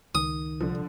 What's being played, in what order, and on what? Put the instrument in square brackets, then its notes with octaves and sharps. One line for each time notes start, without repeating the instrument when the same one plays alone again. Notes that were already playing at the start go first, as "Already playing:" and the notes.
[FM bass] C#2 [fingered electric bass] D#3 [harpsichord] D#6
[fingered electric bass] C2 [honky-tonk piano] D3 F3